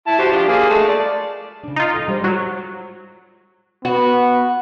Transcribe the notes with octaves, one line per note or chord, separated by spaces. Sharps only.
E4 A5
F#4 G4 C5
F3 D4 G4
A#3 G#4
G#3 A3 A5
D5
C#3 D4
D#4 F4
A4 F#5 A#5
G3 G#3 C5
F#3 F4
B3 F#4